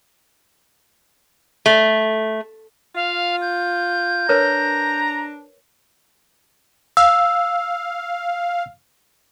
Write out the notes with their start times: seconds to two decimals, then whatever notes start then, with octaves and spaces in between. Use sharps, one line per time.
1.66 A3
2.95 F4 F5
3.41 G6
4.29 D4 A#4 B4 C#5 A#5
6.97 F5 E6